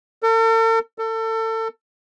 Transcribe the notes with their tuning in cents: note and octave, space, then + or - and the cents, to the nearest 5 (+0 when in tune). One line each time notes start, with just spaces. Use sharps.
A4 +45
A4 +30